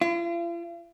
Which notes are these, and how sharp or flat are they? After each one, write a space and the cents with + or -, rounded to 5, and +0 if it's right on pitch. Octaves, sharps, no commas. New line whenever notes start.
F4 -45